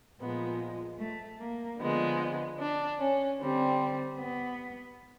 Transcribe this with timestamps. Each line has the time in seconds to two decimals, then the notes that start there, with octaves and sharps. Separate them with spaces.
0.20 A#2 F3 G#3 B3
0.99 A3
1.40 A#3
1.79 D3 F3 G#3 B3
2.59 D4
2.99 C#4
3.39 D3 G3 C4
4.18 B3